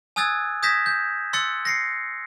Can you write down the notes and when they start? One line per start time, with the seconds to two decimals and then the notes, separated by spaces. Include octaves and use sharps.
0.16 G#5 D#6 E6 F#6 G#6 A6
0.63 D#6 G6 G#6 A#6 B6 E7
0.86 G6
1.33 C6 E6 F#6 A6 C#7
1.65 A#6 C7 C#7